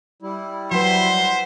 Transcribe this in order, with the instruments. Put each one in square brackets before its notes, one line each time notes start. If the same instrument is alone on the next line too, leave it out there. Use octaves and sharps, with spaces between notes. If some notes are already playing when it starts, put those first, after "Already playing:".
[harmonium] G3 E4
[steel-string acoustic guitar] F#3 B4 [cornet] C5 [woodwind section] E5 F#5 C6